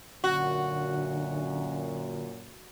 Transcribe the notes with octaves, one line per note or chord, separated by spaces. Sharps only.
F#2 A#2 D3 F#4